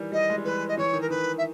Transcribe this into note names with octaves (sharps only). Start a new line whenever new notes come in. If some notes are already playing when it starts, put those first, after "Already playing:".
Already playing: D#3 E3 G3
G3 D#5
G#3
G3
E3 B4
D#5
E3 C#5
D#3
A#4
D#3 B4
E5